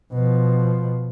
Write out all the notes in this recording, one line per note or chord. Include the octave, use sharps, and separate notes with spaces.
B2 F3